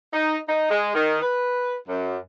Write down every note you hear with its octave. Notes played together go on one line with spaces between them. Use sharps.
D#4
D#4
G#3
D#3
B4
F#2